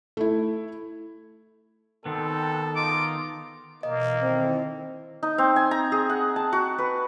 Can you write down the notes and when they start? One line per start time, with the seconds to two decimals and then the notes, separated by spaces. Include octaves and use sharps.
0.17 A3 E4
2.06 B2 D#3 B3 C4 A4
2.76 D#4 F4 D6
3.83 B2 E3 A#3 D#5
4.22 D#3 C4 E4 A4
5.23 D#4
5.38 C4
5.56 G#5
5.71 A#5
5.92 G#4
6.10 F#5
6.36 A5
6.53 F#4
6.78 B4